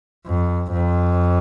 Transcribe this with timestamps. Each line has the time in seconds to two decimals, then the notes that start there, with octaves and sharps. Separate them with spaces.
0.27 F2
0.73 F2